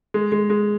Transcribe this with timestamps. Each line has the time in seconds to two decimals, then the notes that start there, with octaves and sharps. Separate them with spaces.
0.14 G#3
0.32 G#3
0.50 G#3